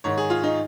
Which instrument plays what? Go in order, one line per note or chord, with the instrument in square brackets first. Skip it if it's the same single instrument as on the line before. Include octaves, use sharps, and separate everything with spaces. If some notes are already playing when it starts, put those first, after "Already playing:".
[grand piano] G#2 D#3 C#5
G#4
F4
D#4